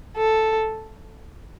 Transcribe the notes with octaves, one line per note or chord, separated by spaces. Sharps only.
A4